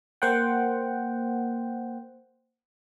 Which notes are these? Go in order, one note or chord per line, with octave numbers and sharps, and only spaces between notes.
A#3 C5 F#5 G5